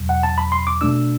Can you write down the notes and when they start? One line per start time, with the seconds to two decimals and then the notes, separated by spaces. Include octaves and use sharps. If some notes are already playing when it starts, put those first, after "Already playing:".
Already playing: E2 B2 F#3
0.09 F#5
0.23 A5
0.38 B5
0.52 C6
0.67 D6
0.81 B2 A3 D4 E6